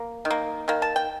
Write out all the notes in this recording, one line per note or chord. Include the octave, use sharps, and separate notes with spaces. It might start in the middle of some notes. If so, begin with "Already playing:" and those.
Already playing: A#3
D#3
A#3
D#3 A#3
A5
G5